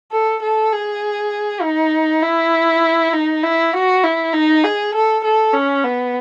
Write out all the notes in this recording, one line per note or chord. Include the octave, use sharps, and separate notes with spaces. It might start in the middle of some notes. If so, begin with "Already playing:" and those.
A4
A4
G#4
D#4
E4
D#4
E4
F#4
E4
D#4
G#4
A4
A4
C#4
B3